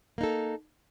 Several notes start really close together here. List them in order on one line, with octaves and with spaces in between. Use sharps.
A#3 D#4 A4